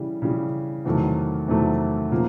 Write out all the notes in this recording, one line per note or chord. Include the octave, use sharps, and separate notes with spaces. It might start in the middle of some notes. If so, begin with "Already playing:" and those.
Already playing: C#3 E3 G3
C#3 E3 G3
E2 C3 D#3 F#3 A3
E2 C3 D#3 F#3 A3
C#3 F3 A#3